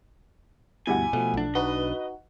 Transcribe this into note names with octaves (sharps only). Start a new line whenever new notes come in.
D2 G2 B2 E4 G4 F#5 G#5
B2 F3 A3
B1 D4
D#4 F#4 B4 D#5